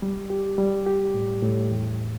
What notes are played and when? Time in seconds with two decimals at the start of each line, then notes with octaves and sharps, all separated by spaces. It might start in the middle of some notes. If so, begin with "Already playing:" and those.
0.02 G3
0.30 G4
0.58 G3
0.86 G4
1.14 A2
1.43 A2
1.71 E2